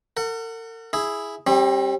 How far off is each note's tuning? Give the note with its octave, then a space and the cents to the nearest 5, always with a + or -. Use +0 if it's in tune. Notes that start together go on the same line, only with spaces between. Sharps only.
A#4 -45 F#5 +0
E4 +0 G#4 +0
G3 +0 C4 +40